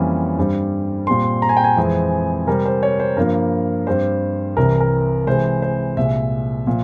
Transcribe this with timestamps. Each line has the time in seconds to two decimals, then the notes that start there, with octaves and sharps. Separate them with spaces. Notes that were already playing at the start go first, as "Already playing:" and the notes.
Already playing: F2 E3 G3 A#3 C#4
0.38 G2 G3 C4
1.07 A#2 G3 C4 C6
1.42 A#5
1.49 G#5
1.57 G5
1.64 G#5
1.77 F2 E3 G#3 C4
2.47 C3 G3 C4 A#4
2.65 C5
2.83 C#5
3.00 C5
3.17 G2 F3 A#3 A#4
3.87 G2 G3 C4 C5
4.57 C2 C3 E3 A#4
4.80 A#4
5.27 C3 E3 G#3 C5
5.62 C5
5.97 C2 A#2 G#3 E5
6.67 A#2 F3